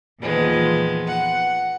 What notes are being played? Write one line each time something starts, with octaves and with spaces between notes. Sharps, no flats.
E2 A#2 D#3 F3 G#3 B3
F#5